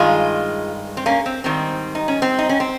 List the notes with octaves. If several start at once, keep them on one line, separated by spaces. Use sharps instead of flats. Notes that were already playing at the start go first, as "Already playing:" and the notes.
Already playing: G2 D#3 G#3 F4 G#4
C4
A#3 C#4
C4
G#2 D#3 G3 C4
D#4
C#4
C4
D#4
C#4
C4